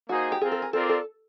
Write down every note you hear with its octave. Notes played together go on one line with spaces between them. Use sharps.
A#3 D#4 F#4 G#4 C5
G4
C4 F4 G#4 A#4
A4
G#4
C4 F4 A4 A#4 D5
A4